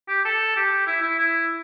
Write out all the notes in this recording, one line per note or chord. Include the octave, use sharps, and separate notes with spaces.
G4
A4
G4
E4
E4
E4